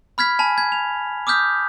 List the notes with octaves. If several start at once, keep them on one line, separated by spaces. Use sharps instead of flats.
B5 F6 G#6 B6
G#5 A5 B5
G#6
F7
D6 D#6 F6 G6 B6